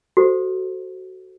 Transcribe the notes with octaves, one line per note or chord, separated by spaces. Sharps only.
F#4 A4 C5